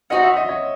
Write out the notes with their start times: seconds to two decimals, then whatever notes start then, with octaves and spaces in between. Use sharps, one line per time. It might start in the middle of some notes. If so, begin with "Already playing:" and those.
0.10 D#4 F#4 C5 D#5 F#5
0.23 E5
0.37 D#5
0.49 C#5